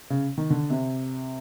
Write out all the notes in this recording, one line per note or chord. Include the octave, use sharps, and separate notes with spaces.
C#3
D#3
D3
C3